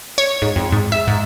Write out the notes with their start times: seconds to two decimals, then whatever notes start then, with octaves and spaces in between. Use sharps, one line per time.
0.18 C#5
0.42 G#2
0.56 F2
0.72 G#2
0.92 E5
1.07 G#2